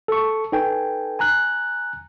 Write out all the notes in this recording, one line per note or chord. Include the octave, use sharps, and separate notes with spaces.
A4 C#6
D#4 A4 B4 G5 G#5
G#5 A#5 F#6